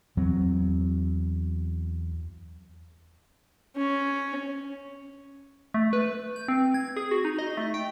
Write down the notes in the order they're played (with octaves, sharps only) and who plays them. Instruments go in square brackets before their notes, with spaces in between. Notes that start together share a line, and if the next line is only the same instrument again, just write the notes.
[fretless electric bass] E2 F#3 C4
[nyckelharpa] C#4
[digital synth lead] A3
B4
G6
C4
G#6
G#4
F#4
D#4
D#5
A3
G5